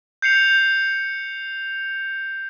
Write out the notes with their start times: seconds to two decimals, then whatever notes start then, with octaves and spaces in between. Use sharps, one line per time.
0.22 G6 C7 C#7 F7